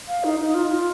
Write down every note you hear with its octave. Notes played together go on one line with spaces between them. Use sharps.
F5
D#4
D#4
F4
F4